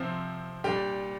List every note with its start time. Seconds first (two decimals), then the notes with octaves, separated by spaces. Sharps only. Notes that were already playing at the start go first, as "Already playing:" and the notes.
Already playing: C3 F3 C4
0.64 A#2 G3 D4 G4